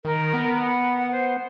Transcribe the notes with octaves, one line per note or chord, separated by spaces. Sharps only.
D#3 A#4
B3
F#5
C5